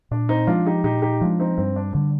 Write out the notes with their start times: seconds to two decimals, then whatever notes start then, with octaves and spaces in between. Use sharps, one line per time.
0.11 A#2 D4
0.29 C4 D#4
0.47 F3 G#3 D4 F4
0.66 D#4 G4
0.84 A#2 D#4 G4
1.02 D#4 G4
1.21 F3 G#3 D4 F4
1.40 C4 D#4
1.58 G2 C4
1.76 D4
1.94 D3 G3 D4